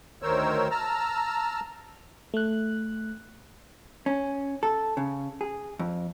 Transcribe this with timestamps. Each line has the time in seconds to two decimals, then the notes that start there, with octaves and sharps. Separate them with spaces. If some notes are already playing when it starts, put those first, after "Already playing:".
0.23 D2 D#3 A#4 C5 C#5 E6
0.71 A5 A#5 E6 F6
2.34 A3 F#6
4.06 C#4
4.63 A4
4.97 C#3
5.41 G#4
5.79 F2